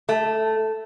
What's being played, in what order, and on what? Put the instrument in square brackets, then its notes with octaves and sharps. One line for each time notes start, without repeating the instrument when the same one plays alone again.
[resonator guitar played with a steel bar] A3